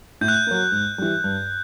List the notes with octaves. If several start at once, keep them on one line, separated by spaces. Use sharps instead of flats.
A2 G6
F#6
G6
F#3 A#3
G#2
E3 G3
G2